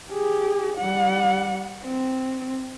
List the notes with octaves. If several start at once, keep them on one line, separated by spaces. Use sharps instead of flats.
G4 G#4
G3 F#5
C4